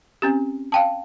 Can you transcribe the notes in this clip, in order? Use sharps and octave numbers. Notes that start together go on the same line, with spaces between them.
C4 C#4 G4
F5 G5 A5